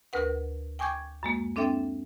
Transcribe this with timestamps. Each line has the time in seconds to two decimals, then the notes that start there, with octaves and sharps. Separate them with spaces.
0.13 D2 A#4 B4 F#5
0.79 G5 G#5 C#6 D6 G6 G#6
1.23 F#2 G#3 A#3
1.56 C4 D4 A4 E5 G5